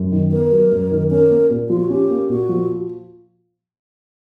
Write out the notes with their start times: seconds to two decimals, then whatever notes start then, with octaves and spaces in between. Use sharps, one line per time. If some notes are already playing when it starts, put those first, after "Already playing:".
Already playing: F#2
0.12 D#3
0.32 B3 A#4
0.52 F#3
0.72 F#2
0.91 D#3
1.11 C#4 A#4
1.30 A#3
1.50 A#2
1.69 F3 F4
1.80 F#4
1.89 C#4 G4
2.10 A#3
2.29 A#2 F#4
2.49 F3